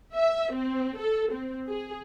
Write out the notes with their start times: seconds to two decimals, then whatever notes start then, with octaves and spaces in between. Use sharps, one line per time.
0.14 E5
0.52 C4
0.97 A4
1.32 C4
1.68 G#4